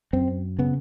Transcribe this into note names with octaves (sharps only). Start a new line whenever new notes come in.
F#2 C4
C#3 B3